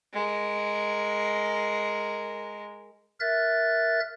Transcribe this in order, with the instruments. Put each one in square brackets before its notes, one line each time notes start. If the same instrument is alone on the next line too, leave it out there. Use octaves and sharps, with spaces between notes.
[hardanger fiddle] G#3 A#4
[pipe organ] A#4 E5 F#6 A6